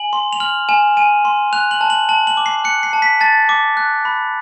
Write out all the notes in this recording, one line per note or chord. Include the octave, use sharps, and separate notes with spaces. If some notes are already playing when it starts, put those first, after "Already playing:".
Already playing: G#5 F#7
C6
F7
F6 F#7
G#5 E7
G#5 D#7
C6
F#6 F7
F#7
A5
F#7
A5 F#7
F#7
D6
C7
F#6 C#7
C7
A5
B6
A5 A6
D6
F#6
B5